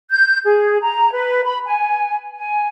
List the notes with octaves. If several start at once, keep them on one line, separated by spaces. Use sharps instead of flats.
G6
G#4
A#5
B4
B5
G#5
G#5